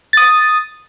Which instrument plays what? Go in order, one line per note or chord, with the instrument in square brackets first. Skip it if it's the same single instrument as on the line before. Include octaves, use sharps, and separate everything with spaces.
[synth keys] D#6 A6